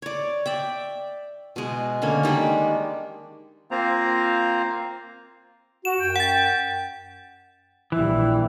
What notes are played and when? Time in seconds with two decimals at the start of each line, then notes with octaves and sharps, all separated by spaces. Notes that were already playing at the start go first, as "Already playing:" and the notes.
0.02 C#5 D5
0.46 D5 E5 G5
1.56 B2 G#3
2.02 D3 A#3 C#4
2.23 D#3 G3 G#3 D4
3.71 A#3 C4 F4 C5 A#5
5.85 F#4 E7
6.00 F#2 G5
6.16 F#5 A6
7.92 A#1 E3 G3 E4